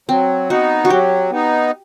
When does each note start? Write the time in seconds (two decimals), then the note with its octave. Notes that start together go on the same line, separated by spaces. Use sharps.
0.09 F#3 C4
0.50 B3 D#4 F#4
0.85 F#4
0.90 F#3 G4
1.30 B3 D#4